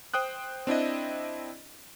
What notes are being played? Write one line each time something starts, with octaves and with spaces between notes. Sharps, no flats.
C5 G5 D#6 F#6
C4 D4 E4 D#5